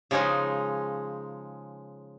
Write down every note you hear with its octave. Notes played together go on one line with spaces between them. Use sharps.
C#3 F3 G#3 C#4 D#4